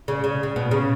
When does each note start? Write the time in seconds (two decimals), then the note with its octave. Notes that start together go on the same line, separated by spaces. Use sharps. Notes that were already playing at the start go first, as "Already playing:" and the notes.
0.08 C#3
0.24 C#3
0.43 C#3
0.56 B2
0.71 C#3